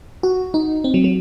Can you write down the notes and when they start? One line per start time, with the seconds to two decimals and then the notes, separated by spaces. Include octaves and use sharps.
0.23 F#4
0.54 D#4
0.84 C4
0.94 F#3
1.04 F#3